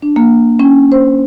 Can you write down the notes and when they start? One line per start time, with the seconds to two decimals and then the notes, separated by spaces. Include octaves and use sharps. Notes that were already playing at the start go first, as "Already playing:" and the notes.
0.02 D4
0.16 A#3
0.59 C#4
0.92 C5